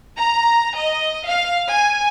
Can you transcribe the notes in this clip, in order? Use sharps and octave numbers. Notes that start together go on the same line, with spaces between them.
A#5
D#5
F5
G#5